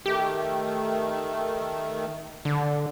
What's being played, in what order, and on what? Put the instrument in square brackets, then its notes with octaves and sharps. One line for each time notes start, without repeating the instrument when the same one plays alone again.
[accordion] D#3 A3 [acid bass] G4
[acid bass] D3